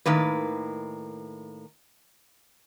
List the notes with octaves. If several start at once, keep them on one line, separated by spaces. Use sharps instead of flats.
A2 D#3 A#3 B4